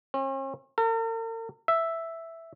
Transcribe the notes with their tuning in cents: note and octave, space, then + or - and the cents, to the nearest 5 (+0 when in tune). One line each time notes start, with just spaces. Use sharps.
C#4 -45
A#4 -45
E5 +0